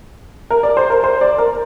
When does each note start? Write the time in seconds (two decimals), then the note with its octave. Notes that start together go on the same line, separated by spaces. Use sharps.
0.50 A#4
0.63 D5
0.77 C5
0.90 A#4
1.04 C5
1.21 D5
1.38 A#4